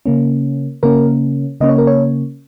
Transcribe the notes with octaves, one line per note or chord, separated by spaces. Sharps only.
C#3 A#3 C#4
C#3 A#3 C#4 A#4
C#3 A#3 C#4 D#5
C#5
A#4
C#5